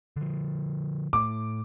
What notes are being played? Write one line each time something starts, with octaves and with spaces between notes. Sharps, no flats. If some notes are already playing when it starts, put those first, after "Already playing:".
D3 F3
A2 A3 D6